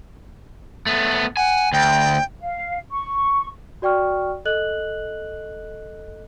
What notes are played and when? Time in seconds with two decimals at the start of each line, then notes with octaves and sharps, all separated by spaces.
0.86 A3 B3
1.37 F#5 G#5
1.73 D2 G5
2.40 F5
2.91 C#6
3.82 F#4 D5 G5 C#6 F6
4.45 A4 D#5 F#6 F#7